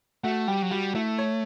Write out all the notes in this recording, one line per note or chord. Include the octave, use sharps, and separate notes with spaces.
A3 F#4 F#5
G3 G4 G5
F#3
G3 F#4 F#5
A3 E4 E5
C#5